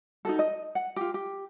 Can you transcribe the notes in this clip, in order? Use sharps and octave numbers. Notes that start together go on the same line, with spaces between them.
D#4 F#4 A4
D#5
F#5
F4 G4
G4